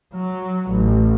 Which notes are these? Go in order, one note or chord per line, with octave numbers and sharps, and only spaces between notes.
F#3
A1